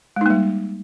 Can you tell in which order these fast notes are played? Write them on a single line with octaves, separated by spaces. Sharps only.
G#3 D#4 A#3 G3